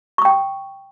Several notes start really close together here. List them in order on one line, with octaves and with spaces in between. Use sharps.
C#6 D#6 G5